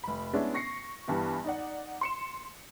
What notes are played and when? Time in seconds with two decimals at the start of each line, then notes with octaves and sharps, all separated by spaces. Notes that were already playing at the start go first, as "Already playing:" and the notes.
0.04 F1 B5
0.33 G#3 B3 C#4 D4 E4
0.54 C#6 A#6 C7 C#7
1.07 G2 E3 B3 G4
1.44 D#4 D5 F#5
2.01 C6 C#7 E7